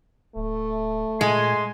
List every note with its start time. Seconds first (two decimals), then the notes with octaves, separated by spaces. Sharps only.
0.36 D1 A3
1.21 A#2 G#3 G#5 C6